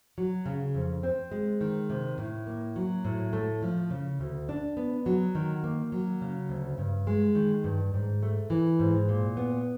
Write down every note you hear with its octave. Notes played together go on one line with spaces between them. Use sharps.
F#3
C#3
F2
C4
G#3
D#3
C3
A2
A#3
F#3
A2
A3
F3
C#3
D2
D4
B3
F#3
D#3
A#3
F#3
C#3
D2
G2
G#3
D#3
G2
G#2
A3
E3
G#2
A#2
B3